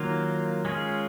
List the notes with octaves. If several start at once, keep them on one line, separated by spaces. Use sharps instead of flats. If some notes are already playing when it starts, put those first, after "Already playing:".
Already playing: D#3 F#3 A#3 F4
G#3 C#4 F4 G#4